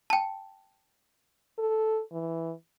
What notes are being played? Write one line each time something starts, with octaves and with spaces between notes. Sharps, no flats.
G5 A5
A4
E3